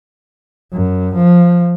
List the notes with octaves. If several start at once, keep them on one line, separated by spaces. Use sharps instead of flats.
F#2
F3